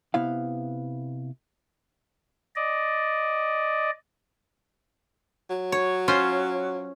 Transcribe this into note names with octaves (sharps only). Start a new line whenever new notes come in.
C3 B3 E4 F5
D5 D#5
F#3
C#5
C#4 F4 C5